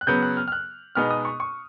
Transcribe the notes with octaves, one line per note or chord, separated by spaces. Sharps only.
F#6
C#3 F#3 B3 G6
F#6
F6
F6
F#6
B2 G#3 B3 D#4 F6
D#6
C#6
C#6